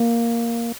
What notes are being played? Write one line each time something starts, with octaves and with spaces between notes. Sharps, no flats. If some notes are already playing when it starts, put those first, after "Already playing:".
Already playing: A#3